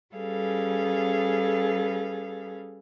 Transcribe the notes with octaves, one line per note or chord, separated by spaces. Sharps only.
G3 C#4 G#4 A4 B4 F5